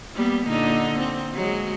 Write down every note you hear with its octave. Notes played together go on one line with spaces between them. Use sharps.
G3 A#3 B3
A#2 D3 D#4
C4
F#3 G#3